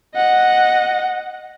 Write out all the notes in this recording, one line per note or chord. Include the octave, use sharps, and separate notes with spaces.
D#5 F#5